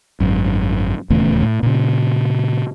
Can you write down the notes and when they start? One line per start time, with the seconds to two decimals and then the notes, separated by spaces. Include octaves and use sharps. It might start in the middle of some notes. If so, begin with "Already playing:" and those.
0.20 G#1 F#2
1.10 D#1 E2 C#3 A3
1.42 A2
1.63 A#2 C#3